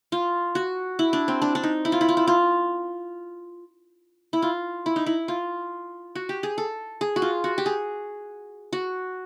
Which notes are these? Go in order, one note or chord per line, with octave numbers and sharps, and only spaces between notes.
F4
F#4
E4
D4
C4
D4
D4
D#4
E4
F4
E4
F4
E4
F4
E4
F4
E4
D#4
E4
F4
F#4
G4
G#4
A4
G#4
F#4
F4
F#4
G4
G#4
F#4